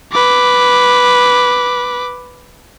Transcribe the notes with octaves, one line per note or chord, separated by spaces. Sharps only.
B4 D6